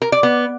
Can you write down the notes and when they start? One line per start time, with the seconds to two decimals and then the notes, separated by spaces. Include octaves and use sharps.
0.02 A#4
0.12 D5
0.23 B3